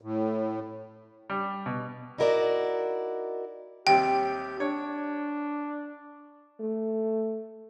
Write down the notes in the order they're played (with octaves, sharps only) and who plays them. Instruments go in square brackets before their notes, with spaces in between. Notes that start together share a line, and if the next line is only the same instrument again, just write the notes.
[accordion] A2
[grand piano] G3
B2
[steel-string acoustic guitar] D#4 E4 F#4 A#4 C5 D5
[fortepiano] D#2 C3 G3 [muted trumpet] G4 [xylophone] G5
[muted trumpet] D4 [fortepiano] C#5
[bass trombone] A3